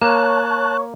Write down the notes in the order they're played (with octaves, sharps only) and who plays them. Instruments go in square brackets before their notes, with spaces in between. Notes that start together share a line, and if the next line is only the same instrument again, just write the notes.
[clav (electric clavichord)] A#3 [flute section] C#5 C#6 [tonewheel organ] A5 F#6